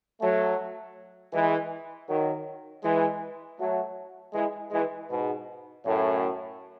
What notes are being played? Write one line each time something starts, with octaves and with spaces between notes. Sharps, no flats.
F#3 A3
E3 G#3
D#3 F#3
E3 G#3
F#3 A3
E3 G#3
E3 G#3
G#2 B2
F#2 A2